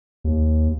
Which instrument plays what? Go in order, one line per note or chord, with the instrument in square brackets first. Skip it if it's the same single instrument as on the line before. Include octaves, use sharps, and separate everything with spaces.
[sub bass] D#2